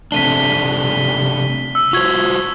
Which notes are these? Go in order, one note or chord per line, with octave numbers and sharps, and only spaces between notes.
C3 A3 D4 B6 D#7 G7
E6
F4 F#4 C5 C#6 G#6